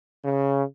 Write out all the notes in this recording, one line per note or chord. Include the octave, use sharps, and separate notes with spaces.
C#3